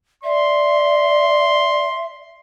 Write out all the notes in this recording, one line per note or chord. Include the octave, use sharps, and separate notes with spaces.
D5 E5 C6